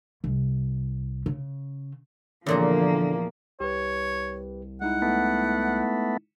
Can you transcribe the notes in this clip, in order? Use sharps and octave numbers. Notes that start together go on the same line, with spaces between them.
C2
C#3
E2 A#2 D3 F3 A#3 A#4
C2 G4 B4 C#5
G#3 D#4 E4 F#5
A3 B3